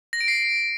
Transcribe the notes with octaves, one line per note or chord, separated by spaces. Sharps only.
A#6
D7
C7